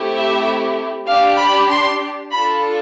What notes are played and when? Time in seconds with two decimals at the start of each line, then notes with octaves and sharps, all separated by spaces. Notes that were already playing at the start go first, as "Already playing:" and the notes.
Already playing: A3 C4 E4 G4
0.15 E5
1.07 D4 G4 F5
1.38 B5
1.69 C6
2.31 D4 F4 A4 B5